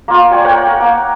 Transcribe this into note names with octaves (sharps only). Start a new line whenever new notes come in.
A#3 F4
D5 G5 G#5 C#6
A#4 C#5 F#5 G5
A#4
A#3 D6